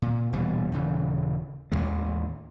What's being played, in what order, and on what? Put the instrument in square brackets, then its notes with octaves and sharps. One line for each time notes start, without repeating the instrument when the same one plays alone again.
[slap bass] A#2
D#1 B2 E3 G3
D#1 C#3 E3
A1 D#2 G#2 G#3